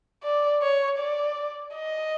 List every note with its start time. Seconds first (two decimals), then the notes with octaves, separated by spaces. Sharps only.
0.23 D5
0.62 C#5
0.99 D5
1.74 D#5